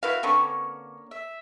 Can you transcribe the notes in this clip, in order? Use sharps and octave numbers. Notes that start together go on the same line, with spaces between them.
E4 F#4 B4 F5
D3 A#3 C4 C#4 B4 C#6
E5